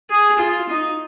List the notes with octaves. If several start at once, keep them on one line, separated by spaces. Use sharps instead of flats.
G#4
F4
D#4